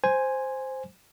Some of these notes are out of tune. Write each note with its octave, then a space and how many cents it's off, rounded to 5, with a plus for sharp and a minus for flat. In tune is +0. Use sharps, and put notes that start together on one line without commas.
C5 +0 G#5 +0